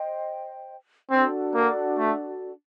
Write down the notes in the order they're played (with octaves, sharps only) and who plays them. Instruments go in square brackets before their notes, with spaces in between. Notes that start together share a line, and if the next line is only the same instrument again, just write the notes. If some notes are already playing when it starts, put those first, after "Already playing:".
Already playing: [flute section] C5 D#5 G5
[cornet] C4 [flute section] D4 F#4 A4 D5
[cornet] A#3
A3